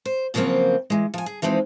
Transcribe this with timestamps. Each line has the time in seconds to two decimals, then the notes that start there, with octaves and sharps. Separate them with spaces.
0.06 C5
0.34 A#2 C#3 F3 F#3 A#3 C4
0.90 E3 G#3
1.14 F3 G#5
1.26 G#4
1.42 E3 F3 G#3 C4 D#4